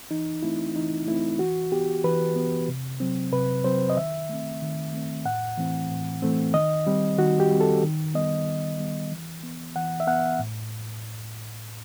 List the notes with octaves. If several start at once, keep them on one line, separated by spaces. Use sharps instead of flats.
E3 D#4
A3 C4 E4
E3 D#4
A3 C4 E4
E3 F#4
B3 G4
E3 B4
B3
C3
F#3 C4
C3 B4
F#3 C4 C5
D#5
D#3 E5
A3 C4
D#3
A3 C4
A2 F#5
E3 A3 C4
A2
E3 A3 C4
D#3 D#5
G3 C4
D#3 F#4
G4
G3 C4
A4
D#3
G3 B3 D#5
D#3
G3 B3
E3
B3
E3 F#5
E5
B3 F#5
A2